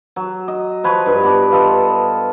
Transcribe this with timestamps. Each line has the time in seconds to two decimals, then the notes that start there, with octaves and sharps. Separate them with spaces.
0.16 F#3
0.48 D#5
0.84 F3 B4 C#5
1.06 G2
1.24 B3 D4
1.52 F4 A4 D#5